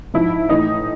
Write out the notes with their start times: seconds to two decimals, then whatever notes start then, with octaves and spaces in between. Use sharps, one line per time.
0.14 G#2 F3 E4
0.49 A2 E3 D#4